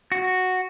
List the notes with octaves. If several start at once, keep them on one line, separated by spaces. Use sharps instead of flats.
F#4